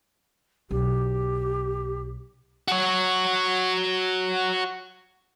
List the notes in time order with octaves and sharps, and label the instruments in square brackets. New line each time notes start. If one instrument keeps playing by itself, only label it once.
[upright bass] B1 [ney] G4
[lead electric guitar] F#4 C#5